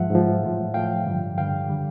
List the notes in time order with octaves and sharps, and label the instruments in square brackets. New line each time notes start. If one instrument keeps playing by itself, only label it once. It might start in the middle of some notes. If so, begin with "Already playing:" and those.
Already playing: [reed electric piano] G#2 F3 E5 F#5
G#2 F3
A2 F3
A2 F3 F5 G5
G2 D3 G3
G2 D3 G3 F5 G5
D3 G3